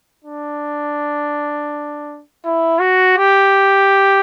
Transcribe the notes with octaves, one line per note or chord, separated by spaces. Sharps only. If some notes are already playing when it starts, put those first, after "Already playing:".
D4
E4
F#4
G4